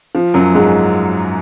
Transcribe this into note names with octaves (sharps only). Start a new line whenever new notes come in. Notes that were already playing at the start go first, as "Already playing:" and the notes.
F3
F#2 F#3
G#2 G#3